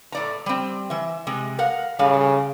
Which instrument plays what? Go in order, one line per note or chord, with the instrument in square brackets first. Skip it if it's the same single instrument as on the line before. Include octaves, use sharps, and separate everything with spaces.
[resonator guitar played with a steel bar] A2 D5 A#5
G3 C4
E3 E5
C3 G#3
A#4 F5 F#5
[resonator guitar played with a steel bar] A2 G3 F5 [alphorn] C#3